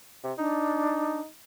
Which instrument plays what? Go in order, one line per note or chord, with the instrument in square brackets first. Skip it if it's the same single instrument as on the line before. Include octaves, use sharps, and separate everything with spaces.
[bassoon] C3
[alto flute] D4 [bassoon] D#4